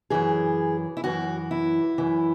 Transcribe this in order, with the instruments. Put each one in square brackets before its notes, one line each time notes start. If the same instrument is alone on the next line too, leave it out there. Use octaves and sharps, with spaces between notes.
[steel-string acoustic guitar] F#2 E3 G#4
E4
F#2 E3 F#4
E4
F#2 E3